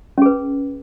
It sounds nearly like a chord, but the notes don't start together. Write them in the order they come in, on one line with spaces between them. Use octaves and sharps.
C#4 G#4 B4